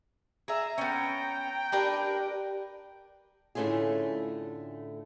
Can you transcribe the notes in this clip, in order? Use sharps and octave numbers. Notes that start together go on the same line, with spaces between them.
G#4 E5 A#5
B3 C#4 G5
D4 G4 A#4 B4
A2 D3 A3 C#4 F4 G#4